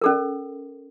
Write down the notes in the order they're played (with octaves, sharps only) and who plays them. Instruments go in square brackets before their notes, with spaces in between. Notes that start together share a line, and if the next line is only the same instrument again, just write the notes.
[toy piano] C#4 A4 A#4